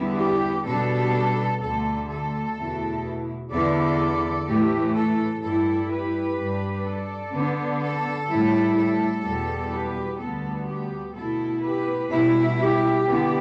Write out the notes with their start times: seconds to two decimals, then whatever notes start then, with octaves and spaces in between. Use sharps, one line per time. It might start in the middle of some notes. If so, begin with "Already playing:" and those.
Already playing: E2 D3 G3 B3 E4
0.19 G4
0.67 B2 G3 B3 D4 A4
1.62 D2 D3 A3 A4
2.10 A4
2.57 E2 B2 A3 E4
3.53 E2 D3 B3 E4 A4 D5
4.48 A2 E3 A3 G4
4.96 A4
5.44 G2 G3 E4 A4
5.91 G4 B4
6.39 G2 G3 D4
6.87 A4 D5
7.35 D3 B3 D4
7.83 A4
8.30 A2 G3 E4
8.78 A4
9.25 E2 B2 G3
9.73 G4 B4
10.20 D2 D3 G3 B3 A4
10.68 G4
11.15 B2 A3 E4 A4
11.64 G4 B4
12.11 B2 G3 E4
12.59 G4
13.07 D3 B3 E4